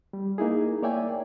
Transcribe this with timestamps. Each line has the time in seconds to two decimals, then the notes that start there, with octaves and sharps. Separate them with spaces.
0.13 G3
0.38 A#3 D#4 E4 G#4
0.82 A#3 C#5 D5 E5 G5 G#5